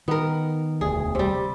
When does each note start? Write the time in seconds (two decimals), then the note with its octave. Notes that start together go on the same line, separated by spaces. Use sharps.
0.08 D#3 B3 A#4
0.81 E1 D2 G#4
1.15 C3 G3